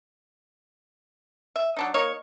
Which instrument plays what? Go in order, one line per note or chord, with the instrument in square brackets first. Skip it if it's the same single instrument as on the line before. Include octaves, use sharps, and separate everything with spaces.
[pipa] E5
F#3 D4 D#4
A#3 D#4 C#5